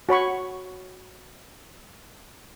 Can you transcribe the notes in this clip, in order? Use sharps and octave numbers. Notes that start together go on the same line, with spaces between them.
F#4 C#5 B5 C#6